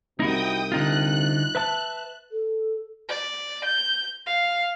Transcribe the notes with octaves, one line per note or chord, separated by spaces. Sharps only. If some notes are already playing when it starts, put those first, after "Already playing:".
C2 C3 D#4 E4 F#4 G5 D#6
D3 D#4 F4 F#6
B4 E5 A5
A4
D5
G6
F5